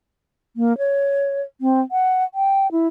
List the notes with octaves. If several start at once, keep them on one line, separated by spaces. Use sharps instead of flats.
A#3
C#5
C4
F#5
G5
E4